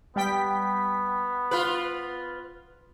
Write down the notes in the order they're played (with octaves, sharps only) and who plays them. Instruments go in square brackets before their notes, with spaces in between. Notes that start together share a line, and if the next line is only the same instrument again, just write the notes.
[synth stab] G3 G5 B6 [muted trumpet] B3
[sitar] F4 B4